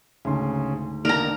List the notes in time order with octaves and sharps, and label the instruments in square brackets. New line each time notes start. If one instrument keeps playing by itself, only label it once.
[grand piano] D2 G#2 C6 [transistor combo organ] C#3
[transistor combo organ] D#3 A#3 D4 [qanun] A#4 A#5